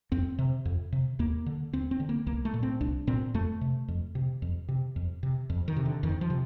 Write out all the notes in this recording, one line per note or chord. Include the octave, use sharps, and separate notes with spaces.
F2 C4
C3
F2
C3
D#2 A#3
D3
D#2 C4
C4
D3
A#3
C2 A#3
A3
A#2
C4
C2 D4
A#2 C4
F2 A3
C3
F2
C3
F2
C3
F2
C3
F2
D#3
C3
D3
F2 D#3
F3
C3